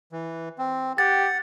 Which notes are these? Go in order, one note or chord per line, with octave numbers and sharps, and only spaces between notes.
E3
C4
G4 F#5 A6